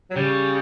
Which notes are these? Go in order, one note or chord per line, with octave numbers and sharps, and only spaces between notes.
F#3
C#3 G3